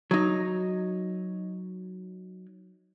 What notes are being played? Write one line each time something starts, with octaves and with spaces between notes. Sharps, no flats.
F#3 D#4